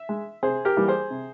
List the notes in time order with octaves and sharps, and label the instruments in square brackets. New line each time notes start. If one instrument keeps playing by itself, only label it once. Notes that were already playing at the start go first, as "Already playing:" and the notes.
Already playing: [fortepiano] E5
G#3
C3 G#4 C5
G4 A#4
E3 G3 A#3
G#4 C5
C3